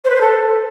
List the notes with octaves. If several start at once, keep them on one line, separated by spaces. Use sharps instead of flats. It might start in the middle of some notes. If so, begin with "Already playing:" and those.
C5
B4
C5
A4